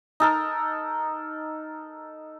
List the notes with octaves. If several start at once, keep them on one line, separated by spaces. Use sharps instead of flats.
D#4 A4 A#4